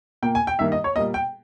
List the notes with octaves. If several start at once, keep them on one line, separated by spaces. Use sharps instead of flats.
A#2 A#3 G5
G#5
G5
G2 D#3 A#3 E5
D#5
C#5
A#2 G3 A#3 D#5
G5